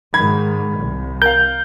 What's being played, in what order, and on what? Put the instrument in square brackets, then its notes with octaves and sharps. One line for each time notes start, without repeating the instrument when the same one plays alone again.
[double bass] G#2 D#3 [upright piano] B5 G#6
[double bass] C2
[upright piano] A#4 F5 [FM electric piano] G6